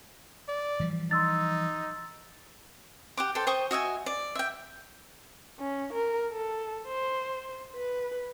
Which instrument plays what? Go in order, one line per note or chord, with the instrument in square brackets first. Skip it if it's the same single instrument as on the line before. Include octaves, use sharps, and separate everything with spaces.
[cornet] D5
[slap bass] E3 F3 G3
[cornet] D#4 [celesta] C6 E6 A6
[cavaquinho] G4 F#5 D6
A4 C5 D5 G5
C5 G5 C#6 D#6
F#4 D#5 E5 G#5
D5
E5 G5
[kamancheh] C#4
A#4
A4
C5
B4